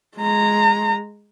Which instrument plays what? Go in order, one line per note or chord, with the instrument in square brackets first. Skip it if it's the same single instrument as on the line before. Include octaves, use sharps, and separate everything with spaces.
[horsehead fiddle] G#3 A#5